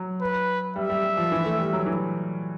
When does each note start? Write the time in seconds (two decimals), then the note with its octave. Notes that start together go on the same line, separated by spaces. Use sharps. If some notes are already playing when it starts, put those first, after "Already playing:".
Already playing: F#3
0.21 B4
0.76 G3 E5
0.90 G3
1.04 G3
1.17 F3
1.32 E3
1.45 A3
1.59 G3
1.73 F#3
1.86 E3